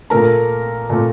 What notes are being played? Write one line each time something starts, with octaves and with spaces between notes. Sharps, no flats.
A#2 A3 A#4 A#5
A#2 A3